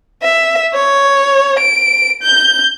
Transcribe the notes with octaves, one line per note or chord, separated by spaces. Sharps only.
E5
C#5
D7
G6